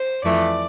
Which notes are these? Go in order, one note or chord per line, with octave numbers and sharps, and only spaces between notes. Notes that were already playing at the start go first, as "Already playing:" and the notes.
Already playing: C5
F2 E3 A3 D5